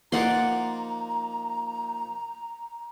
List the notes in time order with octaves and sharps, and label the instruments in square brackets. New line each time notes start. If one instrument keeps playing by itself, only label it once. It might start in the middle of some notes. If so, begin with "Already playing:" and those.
[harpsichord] F3 A#3 D#4 [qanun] D5 F#5 C6 [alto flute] A#5